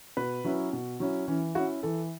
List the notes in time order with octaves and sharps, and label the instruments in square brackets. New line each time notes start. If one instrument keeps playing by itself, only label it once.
[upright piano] B2 [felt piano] B4
[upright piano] F#3 C#4 E4
B2
F#3 C#4 E4
[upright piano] E3 [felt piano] C#4
[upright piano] C#4 E4 [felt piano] F#4
[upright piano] E3 [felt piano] A4